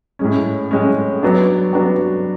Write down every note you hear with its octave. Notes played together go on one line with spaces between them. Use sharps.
A2 G#3 C#4
A2 G#3 C#4
F#3 B3 D4 F#4
F#3 B3 D4 F#4